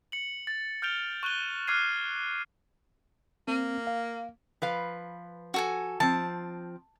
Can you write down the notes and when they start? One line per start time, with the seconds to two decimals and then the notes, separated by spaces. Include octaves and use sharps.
0.12 C#7 F#7
0.47 A6
0.82 F6 G6 A6 D7 F7 G7
1.23 C#6 F#6 D#7 G7
1.67 D6 F6 F#6 G#6 C7 D#7
3.48 A#3 C4
3.87 F5
4.62 F3 B4 F5
5.54 F#4 A4 G#5
6.00 F3 C4 A5